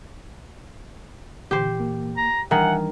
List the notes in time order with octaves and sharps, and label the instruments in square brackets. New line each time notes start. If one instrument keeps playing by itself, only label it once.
[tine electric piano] A#2 E3 [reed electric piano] D3 [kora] G4 C5
[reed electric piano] A#3
[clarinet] A#5
[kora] D#3 [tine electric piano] E3 G3 D4 [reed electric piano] E5 G#5 A#5 [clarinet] F#5